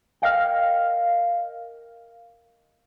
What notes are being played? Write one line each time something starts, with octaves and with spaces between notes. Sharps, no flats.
A#4 D#5 F5 G5